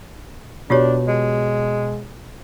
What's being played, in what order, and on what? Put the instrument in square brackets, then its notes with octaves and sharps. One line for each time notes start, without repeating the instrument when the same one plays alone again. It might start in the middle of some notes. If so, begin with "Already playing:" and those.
[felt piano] B2 [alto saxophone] D4 [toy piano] F4 G4 C#5
[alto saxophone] G#3